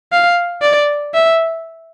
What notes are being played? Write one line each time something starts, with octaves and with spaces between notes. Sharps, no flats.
F5
D5
E5